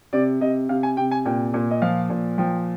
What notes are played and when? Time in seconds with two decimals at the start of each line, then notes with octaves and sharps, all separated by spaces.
0.13 C3 D5
0.41 C3 D#5
0.69 C3 F5
0.83 G#5
0.97 C3 G5
1.11 G#5
1.25 A#2 G5
1.54 A#2
1.71 D#5
1.82 F3 F5
2.10 A#2
2.38 F3 G5